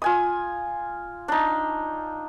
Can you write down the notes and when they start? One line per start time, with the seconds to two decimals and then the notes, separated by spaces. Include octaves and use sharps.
0.02 F4 G#5 D#6
1.28 D4 D#4